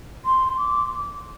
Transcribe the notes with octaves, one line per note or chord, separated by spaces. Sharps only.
C6
D6